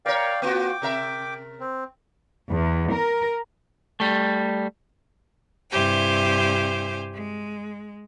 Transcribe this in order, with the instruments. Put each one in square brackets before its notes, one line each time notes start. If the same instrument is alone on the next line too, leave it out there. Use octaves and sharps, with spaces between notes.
[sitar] A#4 C#5 [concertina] D5 F5 G5
[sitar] A#3 F4 F#4 [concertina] G5 D6
[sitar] C3 A#4 E5
[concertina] C4
[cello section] E2
A#4
[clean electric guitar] G3 A3
[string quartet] G2 C3 E4 G4 C5 G#5
G#3